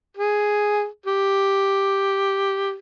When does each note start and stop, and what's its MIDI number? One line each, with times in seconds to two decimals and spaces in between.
0.17 0.86 68
1.06 2.77 67